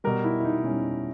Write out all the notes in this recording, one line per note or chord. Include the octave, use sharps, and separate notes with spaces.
B2 G3 A#4
E4
E4
D#4
B2 G3 C#4